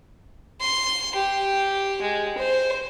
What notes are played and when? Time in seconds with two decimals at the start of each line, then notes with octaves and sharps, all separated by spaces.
0.61 C6
1.15 G4
2.02 G#3
2.38 C5